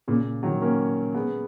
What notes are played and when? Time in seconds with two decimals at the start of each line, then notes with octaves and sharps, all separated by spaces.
0.08 A#2 C#3
0.43 D#3 F#3
0.61 A#3 C#4
1.14 G#3 B3